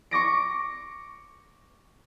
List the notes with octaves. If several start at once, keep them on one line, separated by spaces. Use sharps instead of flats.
C#6 D6 A#6 D7